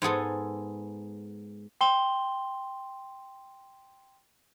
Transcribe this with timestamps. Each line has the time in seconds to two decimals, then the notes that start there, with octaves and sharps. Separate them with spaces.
0.02 G#2 B3 G#4 A4
1.81 G5 C6 G7